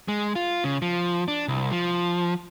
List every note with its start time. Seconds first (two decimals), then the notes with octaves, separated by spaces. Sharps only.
0.08 G#3
0.35 F4
0.64 C#3
0.82 F3
1.28 D4
1.48 C2
1.72 F3